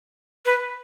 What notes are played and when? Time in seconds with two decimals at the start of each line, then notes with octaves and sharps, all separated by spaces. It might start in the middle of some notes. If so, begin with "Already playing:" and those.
0.46 B4